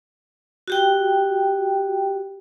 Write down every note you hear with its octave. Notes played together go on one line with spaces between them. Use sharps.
F#4 G4 G5